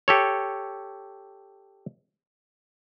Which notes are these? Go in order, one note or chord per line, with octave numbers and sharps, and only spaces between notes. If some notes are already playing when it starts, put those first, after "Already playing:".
G4 A4 C#5